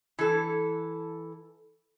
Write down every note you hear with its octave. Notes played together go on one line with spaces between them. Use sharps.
E3 A4